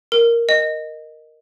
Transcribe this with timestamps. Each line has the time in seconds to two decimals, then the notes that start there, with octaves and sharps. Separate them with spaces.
0.12 A#4
0.49 D#5